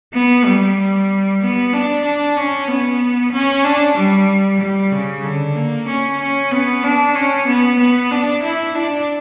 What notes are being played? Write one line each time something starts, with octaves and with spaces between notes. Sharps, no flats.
B3
G3
B3
D4
D4
C#4
B3
C#4
D4
G3
G3
C#3
D3
A#3
C#4
C#4
B3
D4
C#4
B3
B3
D4
E4
D4